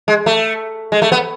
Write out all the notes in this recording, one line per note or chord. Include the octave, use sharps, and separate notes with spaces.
G#3
A3
G#3
A3
B3